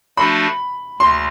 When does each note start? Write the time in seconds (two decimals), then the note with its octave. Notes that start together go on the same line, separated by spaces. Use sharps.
0.17 F3 A3 D4 F#4 A4 B5
1.00 D2 C6